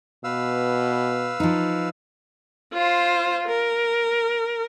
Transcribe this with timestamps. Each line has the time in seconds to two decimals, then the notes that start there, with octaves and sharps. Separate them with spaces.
0.24 B2 B4 F5 E6
1.40 F3 D#4
2.73 F4 C5
3.48 A#4